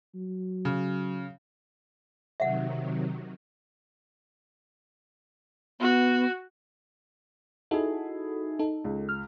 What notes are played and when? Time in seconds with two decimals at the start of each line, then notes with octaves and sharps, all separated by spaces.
0.15 F#3
0.65 C#3
2.40 C3 D#3 F#3 E5 F#5
5.80 B3 F#4
7.71 D#4 E4 F#4 G#4 A4
8.59 D#4 A4
8.84 C#2
9.09 F6